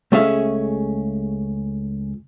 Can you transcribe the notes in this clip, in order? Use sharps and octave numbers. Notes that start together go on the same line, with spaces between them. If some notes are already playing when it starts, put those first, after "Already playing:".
C#2 A3 C#4 G#4 E5 F5